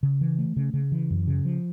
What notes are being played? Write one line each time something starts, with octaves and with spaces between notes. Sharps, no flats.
C#3
E3
A3
C#3
C#3
E3
F#2
C#3
F3